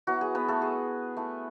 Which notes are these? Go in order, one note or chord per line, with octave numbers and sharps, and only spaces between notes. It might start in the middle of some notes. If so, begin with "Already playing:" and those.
F#3 B3 E4 F#4
G#4
B3 B4
A3 A4
G#4
A3 E4